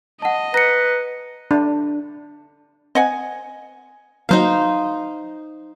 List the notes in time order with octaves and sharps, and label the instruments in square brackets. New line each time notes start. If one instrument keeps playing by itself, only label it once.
[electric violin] D#5 [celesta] F#5 A5
[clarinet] B4 [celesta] A#5 [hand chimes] A#6 C#7
[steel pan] D4
[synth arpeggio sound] C4 [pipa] D#5 F#5 G#5
[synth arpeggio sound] F#3 A#3 [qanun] D#4 C5 F5